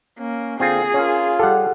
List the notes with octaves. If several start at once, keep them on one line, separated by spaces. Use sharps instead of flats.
A#3 C#4
D3 C4 F4 G#4 G#5
C#4 F4 A#4
G3 G4 A4 F#5